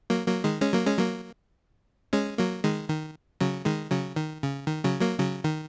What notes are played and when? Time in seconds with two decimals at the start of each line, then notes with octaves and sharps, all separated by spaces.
0.10 F#3 A#3
0.26 F#3 A#3
0.44 D#3 G#3
0.61 G#3 C#4
0.73 F#3 A#3
0.86 G#3 C#4
0.99 F#3 A#3
2.13 G#3 C#4
2.38 F#3 A#3
2.64 D#3 G#3
2.89 D#3
3.41 C#3 F#3
3.65 D#3 G#3
3.91 C#3 F#3
4.16 D#3
4.43 C#3
4.67 D#3
4.84 C#3 F#3
5.01 F#3 A#3
5.18 C#3 F#3
5.44 D#3